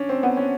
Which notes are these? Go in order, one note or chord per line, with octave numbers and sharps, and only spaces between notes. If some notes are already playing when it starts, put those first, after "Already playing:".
Already playing: C#4 D4
C4
B3
C#4